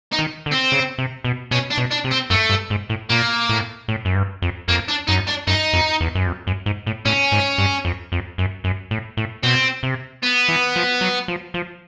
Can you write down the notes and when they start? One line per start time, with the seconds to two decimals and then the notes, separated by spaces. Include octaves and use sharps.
0.12 D#4
0.19 D#3
0.46 D3
0.52 C4
0.72 C#3
0.98 C3
1.24 B2
1.51 B2 C#4
1.70 D4
1.77 B2
1.91 D4
2.04 C3
2.11 C4
2.30 F#2 A3
2.50 G2
2.70 G#2
2.89 A2
3.10 A#2 A#3
3.49 A2
3.88 A2
4.05 F#2
4.15 G2
4.42 F2
4.68 F2 A#3
4.88 D4
5.07 F#2 D#4
5.27 D4
5.47 F#2 D#4
5.73 F2
6.00 E2
6.15 F#2
6.26 F2
6.47 F#2
6.66 G#2
6.86 A2
7.05 A2 C#4
7.32 G#2
7.58 G2
7.85 F2
8.12 F2
8.38 F#2
8.64 F#2
8.91 A2
9.17 A2
9.43 B2 C4
9.83 C3
10.23 B3
10.48 E3
10.76 F3
11.01 F#3
11.28 F3
11.54 F3